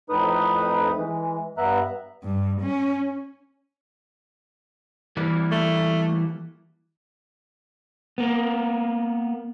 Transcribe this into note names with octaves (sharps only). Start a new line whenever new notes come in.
F2 A2 D#4 B4 D#6
E3 G#3
G2 B3 E5 A#5 F#6
G2
C#4
E3 G3 A#3
A3
A#3 B3